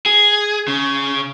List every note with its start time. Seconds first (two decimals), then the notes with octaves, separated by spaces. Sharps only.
0.06 G#4
0.68 C#3